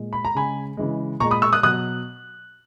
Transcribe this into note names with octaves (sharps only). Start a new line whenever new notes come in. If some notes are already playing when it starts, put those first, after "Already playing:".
Already playing: A#2 G#3
B5
A#5
C#3 G#3 G#5 B5
C#3 E3 G#3
A#2 G#3 A#5 C#6
B5 D#6
C#6 E6
D#6 F#6
B2 F#3 D#6 F#6